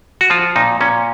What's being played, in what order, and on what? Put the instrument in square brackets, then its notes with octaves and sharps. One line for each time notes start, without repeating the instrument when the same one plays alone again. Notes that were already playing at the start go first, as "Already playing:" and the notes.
[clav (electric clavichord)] F#4
F3 F4
A#2 D#4
A#2 C#4